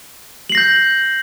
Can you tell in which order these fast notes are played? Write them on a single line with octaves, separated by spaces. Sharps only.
F#7 C7 A#6 G6